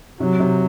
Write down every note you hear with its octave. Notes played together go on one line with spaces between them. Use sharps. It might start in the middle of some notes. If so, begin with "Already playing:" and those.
C3 F#3
C3